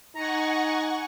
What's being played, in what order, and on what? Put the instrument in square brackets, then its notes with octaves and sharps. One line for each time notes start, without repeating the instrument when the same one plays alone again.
[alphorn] D#4 [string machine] F#5 G#5 C#6 [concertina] A#5